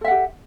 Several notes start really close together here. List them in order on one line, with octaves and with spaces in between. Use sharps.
A4 E5 F#5 G4